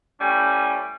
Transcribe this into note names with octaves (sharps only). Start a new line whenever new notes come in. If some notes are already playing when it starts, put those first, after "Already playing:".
A2 G3 C#4 G#5